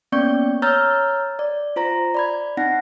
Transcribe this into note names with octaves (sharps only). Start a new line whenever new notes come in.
A#3 B3 C#4 D5 C#6 G6
C#5 A#5 E6 F6 G6 A6
D5
F4 C5 A#5 A#6
D5 B5 G#6
C4 D#4 F#5 A#6